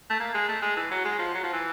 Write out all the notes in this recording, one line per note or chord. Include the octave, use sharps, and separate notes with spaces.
A3
A#3
G#3
A3
G#3
E3
F#3
G#3
F3
F#3
F3
E3